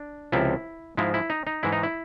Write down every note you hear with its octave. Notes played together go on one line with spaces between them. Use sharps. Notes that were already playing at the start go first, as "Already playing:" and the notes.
Already playing: D4
C#2 C3 F3 E4
G#2 F3 G#3 E4
E4
D#4
D#4
G#2 E3 G#3 E4
D#4
E4